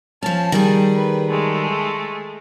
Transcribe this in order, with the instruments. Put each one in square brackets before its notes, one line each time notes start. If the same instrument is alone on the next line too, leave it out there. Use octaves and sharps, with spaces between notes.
[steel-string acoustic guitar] F3 C#4 [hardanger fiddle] A5
[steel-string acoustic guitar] D#3 G3 G#4
[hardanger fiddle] B4
G#3 A3